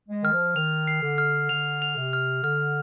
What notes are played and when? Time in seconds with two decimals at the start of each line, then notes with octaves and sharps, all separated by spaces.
0.09 G#3
0.23 D#3 F6
0.33 F3
0.56 D#3 F7
0.87 C7
1.03 D3
1.18 F6
1.49 D3 F7
1.82 F7
1.96 C3
2.13 F6
2.44 D3 F6